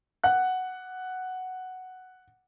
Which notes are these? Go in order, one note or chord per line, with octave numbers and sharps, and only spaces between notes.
F#5 F#6